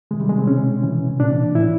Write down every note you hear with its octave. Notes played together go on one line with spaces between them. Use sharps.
C3 D#3 G#3
G3
G#3
C4
B2 C#4
C3 E3
A#2 D4
A2 E3 E4